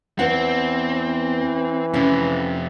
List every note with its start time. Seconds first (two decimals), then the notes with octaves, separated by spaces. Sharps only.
0.19 E2 E3 C4 E4 F#5
1.93 F2 C3 C#4 E4